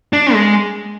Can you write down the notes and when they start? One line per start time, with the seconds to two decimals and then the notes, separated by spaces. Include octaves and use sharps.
0.13 D4
0.34 G#3